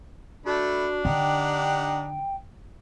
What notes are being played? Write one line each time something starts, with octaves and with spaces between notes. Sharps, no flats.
A3 D4 F#4 B5
D3 D#4 G4 F#5 G5